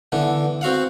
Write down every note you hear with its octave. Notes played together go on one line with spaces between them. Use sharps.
D3 E3 B3
C4 F#4 F5 F#5